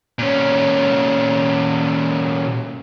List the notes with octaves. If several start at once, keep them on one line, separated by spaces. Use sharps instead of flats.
A#2 C#4